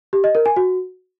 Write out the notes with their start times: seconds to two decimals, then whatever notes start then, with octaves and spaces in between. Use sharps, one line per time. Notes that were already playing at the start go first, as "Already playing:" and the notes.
0.13 G4
0.24 D#5
0.35 A#4
0.46 G#5
0.57 F#4